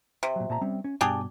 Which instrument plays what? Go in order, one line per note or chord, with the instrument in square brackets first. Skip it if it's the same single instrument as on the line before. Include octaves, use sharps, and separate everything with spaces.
[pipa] C3
[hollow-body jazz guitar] A#2 F#3
A#2 A5 A#5
G3 C4 C#4
C#4
[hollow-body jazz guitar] G2 B2 [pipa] D4 G4 G#4